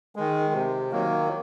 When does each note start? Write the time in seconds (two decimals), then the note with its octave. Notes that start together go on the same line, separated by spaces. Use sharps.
0.16 D#3 G#3
0.53 C3
0.91 D#3 F#3 A#3